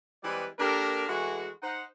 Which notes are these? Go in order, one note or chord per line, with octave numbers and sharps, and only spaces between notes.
E3 G3 G#3 C4 B4 D5
A#3 D4 G4 A4 A#4
E3 G#3 A3 F#4
D#4 C5 F#5